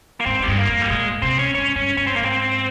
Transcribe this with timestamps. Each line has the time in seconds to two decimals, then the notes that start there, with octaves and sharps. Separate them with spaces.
0.20 A#3
0.26 G#2 C4
0.40 G#2
0.43 G3
0.48 G2 G#3
0.58 A#3
0.68 F2
0.82 G3
0.90 A#2 G#3
1.22 C3 C4
1.39 C#4
1.54 G#2 C#4
1.76 G2 C#4
1.97 G2 C#4
2.07 C4
2.16 G#2 A#3
2.25 C4